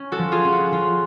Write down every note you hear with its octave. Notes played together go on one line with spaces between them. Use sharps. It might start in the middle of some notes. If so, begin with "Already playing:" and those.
Already playing: C#4
F#4 A4
F3
F4 G#4
C#4
F#4
F3 F4